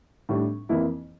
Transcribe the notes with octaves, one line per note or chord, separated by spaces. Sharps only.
A2 G3 D4
F2 E3 A#3 E4